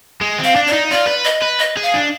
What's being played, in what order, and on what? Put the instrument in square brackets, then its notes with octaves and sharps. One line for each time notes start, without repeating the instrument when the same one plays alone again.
[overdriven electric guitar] G#3
C4
[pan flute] F5
[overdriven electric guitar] D4
[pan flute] D5
[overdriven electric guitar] D#4
[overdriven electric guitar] F4 [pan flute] D5
[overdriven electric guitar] B4
[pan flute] D#5
[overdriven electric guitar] B4
[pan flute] D#5
[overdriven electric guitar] G#4
[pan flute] F5
[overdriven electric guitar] D4